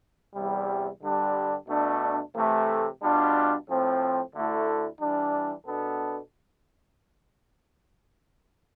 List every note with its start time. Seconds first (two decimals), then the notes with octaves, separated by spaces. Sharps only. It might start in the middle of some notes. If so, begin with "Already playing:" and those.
0.35 E2 C3 G3
1.02 G2 D3 G3 D4
1.67 B2 A3 D4
2.34 C3 E3 A3
3.01 B2 G3 D4 F4
3.66 A2 F3 C4
4.33 D2 D3 A3 E4
5.00 E3 G3 D4
5.66 B2 B3 D4 A4